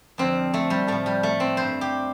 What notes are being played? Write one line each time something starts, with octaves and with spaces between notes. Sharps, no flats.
F2 D3 F3 C4
A3
G3
A2 F3 A3
G3
A3
C4
G2 G3 C5
G4